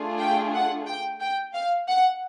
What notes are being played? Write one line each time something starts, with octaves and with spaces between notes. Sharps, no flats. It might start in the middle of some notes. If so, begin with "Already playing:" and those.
Already playing: A3 D4 F4 G#4
G5
F#5
G5
G5
F5
F#5